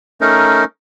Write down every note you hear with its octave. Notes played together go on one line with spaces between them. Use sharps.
A3 C#4 D#4 A#4